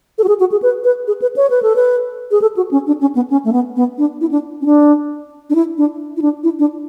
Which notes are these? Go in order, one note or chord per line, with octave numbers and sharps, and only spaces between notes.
A4
F#4
G#4
F#4
G#4
B4
B4
G#4
B4
C#5
B4
A4
B4
G#4
A4
F#4
C#4
D4
C#4
B3
C#4
A3
B3
B3
D4
E4
D4
C#4
D4
D4
E4
D4
E4
D4
E4
D4